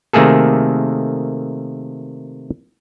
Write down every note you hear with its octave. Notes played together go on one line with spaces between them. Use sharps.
C3 D#3 A3 A#3 G#4 A4